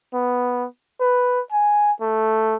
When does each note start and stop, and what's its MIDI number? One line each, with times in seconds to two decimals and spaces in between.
0.14 0.66 59
1.01 1.41 71
1.52 1.92 80
2.01 2.56 57